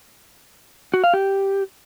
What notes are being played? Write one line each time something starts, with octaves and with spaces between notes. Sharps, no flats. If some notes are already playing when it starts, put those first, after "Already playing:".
F#4
F5
G4